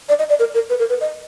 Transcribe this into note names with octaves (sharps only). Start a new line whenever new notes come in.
D5
D#5
D5
A#4
A#4
B4
A#4
B4
D#5